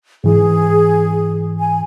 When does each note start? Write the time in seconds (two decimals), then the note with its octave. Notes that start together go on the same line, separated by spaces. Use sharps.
0.24 G#2 E3 G#4
1.58 G#5